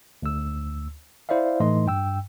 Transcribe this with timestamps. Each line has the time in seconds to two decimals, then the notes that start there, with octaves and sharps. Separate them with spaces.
0.22 D2 E6
1.29 E4 C5 D5 E5 F5
1.60 A2 E3 A3 D#4 D#5 C6
1.87 G2 G5 E6